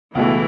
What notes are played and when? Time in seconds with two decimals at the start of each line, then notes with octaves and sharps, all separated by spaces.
0.15 C#2 B2 E3 A3